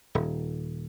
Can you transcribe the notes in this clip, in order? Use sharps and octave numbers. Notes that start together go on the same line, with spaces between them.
D#1